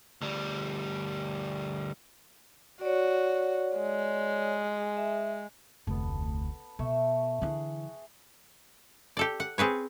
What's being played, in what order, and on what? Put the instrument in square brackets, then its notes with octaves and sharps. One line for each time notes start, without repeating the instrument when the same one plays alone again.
[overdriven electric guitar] D2 G3
[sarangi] F#4 [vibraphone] C#5 D5
[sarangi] G#3
[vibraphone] E5
[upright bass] F1 D2 [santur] B3 A4
[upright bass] B2 [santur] A3 E5 C#6
[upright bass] D3 E3 [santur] G#4 F#5
[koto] G4 A4 D5
F#5
C4 G#4 B4 C#5